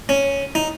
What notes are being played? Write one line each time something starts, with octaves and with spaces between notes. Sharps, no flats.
C#4
D#4